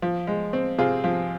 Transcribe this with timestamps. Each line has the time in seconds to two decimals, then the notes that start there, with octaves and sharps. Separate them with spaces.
0.02 F3
0.27 G#3
0.53 C4
0.78 C3 F4 G#4
1.04 F3